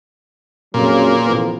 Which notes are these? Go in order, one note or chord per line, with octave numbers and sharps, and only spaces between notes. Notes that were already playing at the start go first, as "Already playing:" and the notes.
F2 A#2 C#3 F#3
A1 F3 B3